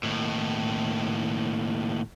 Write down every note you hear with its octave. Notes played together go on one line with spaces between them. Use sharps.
D#2 A2